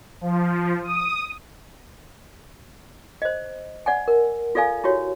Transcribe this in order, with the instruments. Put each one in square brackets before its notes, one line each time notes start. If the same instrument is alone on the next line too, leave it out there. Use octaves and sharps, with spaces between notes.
[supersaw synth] F3
D#6
[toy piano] C5 D#5
D5 F#5 G#5
A#4
F4 A4 D5 F5 G#5
E4 F#4 G4 C#5